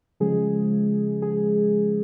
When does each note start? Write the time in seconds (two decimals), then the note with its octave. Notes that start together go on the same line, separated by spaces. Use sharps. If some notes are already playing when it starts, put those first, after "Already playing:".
0.20 C#3 F3 G#3 G#4
1.22 G#4